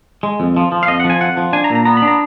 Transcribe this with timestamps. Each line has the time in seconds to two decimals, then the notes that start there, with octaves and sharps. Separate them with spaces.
0.23 G#3
0.40 F2
0.57 F3
0.72 F3
0.83 F5
0.88 F2 D#5
1.00 F#5
1.04 F3
1.10 G#5
1.21 F2 F#5
1.37 F3
1.53 D4 G#5
1.64 A#5
1.70 A#2
1.75 A#5
1.85 B3 A#5
1.97 B5
2.02 D4
2.08 A#5